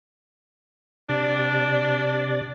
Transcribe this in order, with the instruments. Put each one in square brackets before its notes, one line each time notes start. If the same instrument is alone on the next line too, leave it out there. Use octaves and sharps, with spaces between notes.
[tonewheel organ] C3 D5 [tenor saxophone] D4